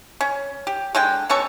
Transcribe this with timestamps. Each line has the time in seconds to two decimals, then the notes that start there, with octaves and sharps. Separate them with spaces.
0.21 C#4
0.67 G4
0.95 D3 G#3 G5
1.30 B2 C#4 A4 C#6